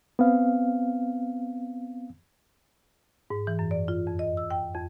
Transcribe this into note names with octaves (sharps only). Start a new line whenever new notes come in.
B3 C4 F5
G#2
E3
F#2
D5
F4
F2
D#5
E6
G5
F2